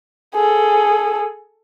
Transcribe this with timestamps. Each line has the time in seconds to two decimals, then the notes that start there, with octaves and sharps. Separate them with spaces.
0.35 G#4 A4